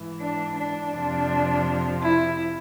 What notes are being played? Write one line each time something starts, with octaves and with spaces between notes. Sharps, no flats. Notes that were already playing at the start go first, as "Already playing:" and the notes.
Already playing: G#2 E3
D4
D4
F2 C3 F3
E4